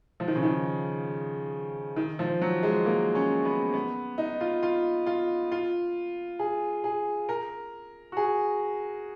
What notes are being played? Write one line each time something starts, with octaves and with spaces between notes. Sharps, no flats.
F3
D#3
C#3
D#3
D#3
F3
F#3
G#3
A#3
C#4
B3
B3
D#4
F4
F4
F4
F4
G#4
G#4
A#4
F#4
G#4